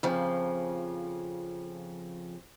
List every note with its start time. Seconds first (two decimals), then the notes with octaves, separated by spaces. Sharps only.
0.03 F2 C#3 F3